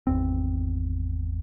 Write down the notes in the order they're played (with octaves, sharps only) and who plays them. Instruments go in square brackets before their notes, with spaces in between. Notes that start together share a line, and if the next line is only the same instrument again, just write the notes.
[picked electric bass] G#1 E2 C4